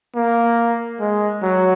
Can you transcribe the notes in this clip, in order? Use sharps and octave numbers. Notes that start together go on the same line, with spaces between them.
A#3
G#3
F#3